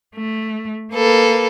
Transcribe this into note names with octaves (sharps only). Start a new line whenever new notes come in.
A3
A#3 A4 B4